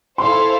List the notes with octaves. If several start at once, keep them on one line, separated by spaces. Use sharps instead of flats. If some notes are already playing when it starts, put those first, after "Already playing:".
E4 A4 C5 F5 C6